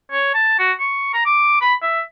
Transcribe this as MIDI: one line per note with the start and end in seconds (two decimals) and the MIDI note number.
0.12 0.33 73
0.34 0.58 81
0.59 0.72 66
0.80 1.13 85
1.14 1.25 82
1.26 1.56 86
1.61 1.74 83
1.82 2.01 76